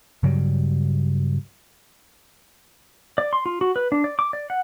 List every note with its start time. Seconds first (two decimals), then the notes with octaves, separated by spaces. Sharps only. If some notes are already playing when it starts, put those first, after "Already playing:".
0.23 G2 C#3 F#3 G3
3.18 D5
3.33 C6
3.46 F4
3.61 F#4
3.76 B4
3.92 D4
4.04 D5
4.19 D6
4.33 D5
4.50 F#5